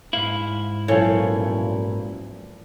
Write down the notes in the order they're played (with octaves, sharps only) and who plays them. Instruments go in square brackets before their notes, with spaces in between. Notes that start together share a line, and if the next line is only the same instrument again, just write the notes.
[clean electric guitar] G#2 E4 [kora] F5
[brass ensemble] B1 F#2 A#2 [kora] E3 F3 [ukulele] A4 C#5